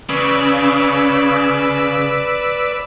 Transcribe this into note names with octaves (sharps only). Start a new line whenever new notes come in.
C#3 B4 D5 E6